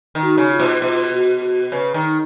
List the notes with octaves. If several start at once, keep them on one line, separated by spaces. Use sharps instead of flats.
D#3
F#4
C#3
F4
B2
B2 F4
F#4
F#4
C#3 B4
D#3